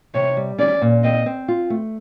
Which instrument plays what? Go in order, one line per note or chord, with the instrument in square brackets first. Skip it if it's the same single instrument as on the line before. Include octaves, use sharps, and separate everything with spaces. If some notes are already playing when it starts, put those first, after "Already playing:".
[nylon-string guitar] C3 [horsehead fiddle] C#5
[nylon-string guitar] G3
[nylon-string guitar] C#4 [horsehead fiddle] D5
[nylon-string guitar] A#2
[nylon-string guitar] C4 [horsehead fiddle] D#5
[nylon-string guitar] C4
F4
A3